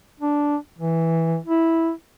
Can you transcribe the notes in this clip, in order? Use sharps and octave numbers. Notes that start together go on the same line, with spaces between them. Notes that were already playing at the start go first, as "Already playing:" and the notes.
D4
E3
E4